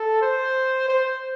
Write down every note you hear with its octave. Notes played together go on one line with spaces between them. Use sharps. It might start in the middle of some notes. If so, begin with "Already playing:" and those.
Already playing: A4
C5
C5